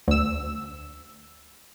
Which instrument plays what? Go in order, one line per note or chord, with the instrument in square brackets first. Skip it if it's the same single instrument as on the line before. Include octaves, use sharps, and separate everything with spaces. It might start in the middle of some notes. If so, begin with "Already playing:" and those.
[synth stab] D2 E6